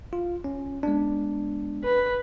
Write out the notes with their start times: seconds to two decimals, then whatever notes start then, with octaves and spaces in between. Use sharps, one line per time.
0.13 F4
0.44 C#4
0.83 G#3 B3 D4
1.85 B4